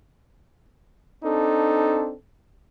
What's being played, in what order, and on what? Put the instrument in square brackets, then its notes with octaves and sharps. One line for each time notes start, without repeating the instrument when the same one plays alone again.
[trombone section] C4 D4 D#4 A4